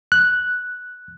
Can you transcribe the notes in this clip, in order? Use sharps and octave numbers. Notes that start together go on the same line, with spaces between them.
F#6